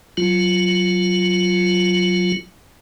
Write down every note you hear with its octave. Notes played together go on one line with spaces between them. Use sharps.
F#3 F4